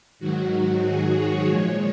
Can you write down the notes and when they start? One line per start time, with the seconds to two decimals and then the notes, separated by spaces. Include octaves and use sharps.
0.19 G#2 D#3 F#3 F#4
0.52 F#4
0.84 G#4
1.16 C#5
1.48 A#2 F3 G#3 C#5